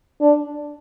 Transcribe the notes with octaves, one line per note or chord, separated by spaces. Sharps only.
D4